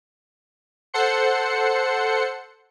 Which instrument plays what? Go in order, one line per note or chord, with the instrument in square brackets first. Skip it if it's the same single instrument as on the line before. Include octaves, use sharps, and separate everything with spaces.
[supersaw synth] A4 C5 F#5 C6 C#7